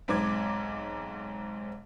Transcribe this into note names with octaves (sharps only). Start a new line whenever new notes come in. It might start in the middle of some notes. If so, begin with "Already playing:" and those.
B1 G#2 C4 D6 G#6